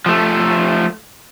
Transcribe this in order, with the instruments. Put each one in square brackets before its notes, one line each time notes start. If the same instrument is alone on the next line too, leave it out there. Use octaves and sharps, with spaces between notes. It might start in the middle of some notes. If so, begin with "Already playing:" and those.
[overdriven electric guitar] F3 A3